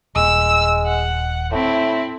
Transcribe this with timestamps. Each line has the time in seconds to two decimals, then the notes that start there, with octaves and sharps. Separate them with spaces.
0.16 D#1 G#3 E6
0.86 F#5
1.52 A2 C4 E4